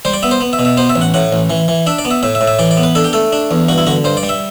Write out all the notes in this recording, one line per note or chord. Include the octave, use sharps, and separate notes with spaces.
G3 C5
D5
B3 E5
C5
B3
E5
B2
E5
B3 C5
E5
A1
F#5
A2 F#5
A1
E3
E3
D4 E5
D5
B3
E5
A2 E5
E5
A2
E5
E3 D5
D5
B3
B4
D4 A4
G4
A3 A4
D4
E2
G2 F#4
E4
D3 F#4
G2 C5
D5
G3
E5